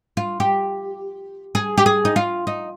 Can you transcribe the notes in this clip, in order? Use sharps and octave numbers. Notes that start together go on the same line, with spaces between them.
F4
G4
G#4
G4
G#4
D#4
F4
D#4